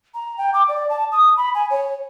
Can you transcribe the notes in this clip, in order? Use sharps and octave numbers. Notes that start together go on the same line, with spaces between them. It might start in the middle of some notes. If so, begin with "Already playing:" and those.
A#5
G5
D6
D5
A5
D#6
B5
G#5
C#5